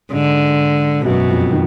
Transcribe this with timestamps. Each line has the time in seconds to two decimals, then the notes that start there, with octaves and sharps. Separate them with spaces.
0.13 G#2 D3 G#3
1.05 F#2 B2 F#3
1.29 F2 F3
1.52 D#3